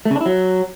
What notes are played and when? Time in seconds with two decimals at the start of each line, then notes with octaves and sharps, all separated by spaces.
0.05 A3
0.11 C#3
0.16 D4
0.21 E4
0.26 F#3